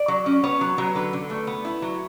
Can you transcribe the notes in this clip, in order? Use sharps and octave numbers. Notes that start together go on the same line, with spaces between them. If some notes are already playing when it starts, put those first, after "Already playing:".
Already playing: D5
F#3
C#4
B3 C#5
F#3
F#3
D3 B4
D3
A3
B3
E4
F#3